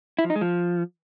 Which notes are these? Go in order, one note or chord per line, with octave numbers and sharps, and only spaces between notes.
E4
F3
D#4
G#3
F3